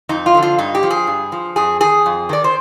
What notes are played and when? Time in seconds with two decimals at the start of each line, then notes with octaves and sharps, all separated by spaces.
0.09 F2 D#4
0.26 F4
0.35 D3 F3
0.42 F4
0.58 G2 D#4
0.75 G4
0.83 F3
0.90 G#4
1.07 G2
1.32 F3
1.56 F2 G#4
1.81 D#3 G#4
2.06 F2
2.29 D#3 D5
2.44 C5